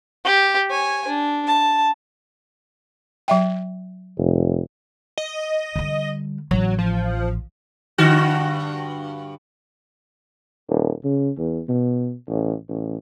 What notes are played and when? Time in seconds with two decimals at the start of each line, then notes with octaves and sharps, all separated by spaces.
0.25 G4
0.71 C#5 G#5
1.08 D4
1.47 A5
3.28 F#3 E5 G5
4.18 F1
5.18 D#5
5.76 D3 G3
6.51 A1 F#3
6.79 F3
7.98 G2 D3 F#4
10.69 D#1
11.04 C#3
11.38 E2
11.69 B2
12.28 A1
12.69 A1